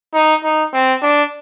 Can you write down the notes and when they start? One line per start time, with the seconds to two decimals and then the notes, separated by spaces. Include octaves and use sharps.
0.14 D#4
0.44 D#4
0.73 C4
1.03 D4